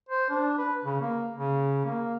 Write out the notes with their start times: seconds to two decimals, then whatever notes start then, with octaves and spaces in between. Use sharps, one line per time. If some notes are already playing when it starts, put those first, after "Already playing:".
0.09 C5
0.30 D4
0.58 B4
0.84 C#3
1.01 A#3
1.36 C#3
1.85 A#3